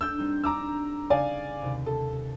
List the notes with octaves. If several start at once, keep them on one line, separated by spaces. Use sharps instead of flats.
D4 A4 E6 G6
G3 C4 D#4
D4 A#5 D6 E6
C#3 D5 F5 G#5
D#2 C3
A4